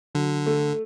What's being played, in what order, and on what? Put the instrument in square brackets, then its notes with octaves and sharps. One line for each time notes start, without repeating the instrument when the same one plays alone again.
[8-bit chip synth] D3 [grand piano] F#3
[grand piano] A3